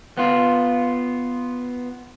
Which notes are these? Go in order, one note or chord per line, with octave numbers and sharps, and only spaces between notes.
B3 F4